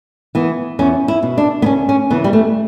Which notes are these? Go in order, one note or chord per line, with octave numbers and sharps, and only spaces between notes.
E3 B3
E2 C#4
E4
B2
D4
B3
D2 C#4
C#4
C#3 E3 B3
G3
A3